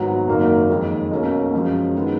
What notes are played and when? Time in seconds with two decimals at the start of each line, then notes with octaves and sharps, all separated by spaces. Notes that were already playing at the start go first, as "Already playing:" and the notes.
Already playing: G#1 G#2 F#3 B3 F#4
0.27 F#1 F#2 D#3 A#3
0.69 F2 D#3 G#3
1.11 B1 B2 A#3 C#4
1.53 F#2 F3 G#3 C#4
1.96 D#3 G#3 B3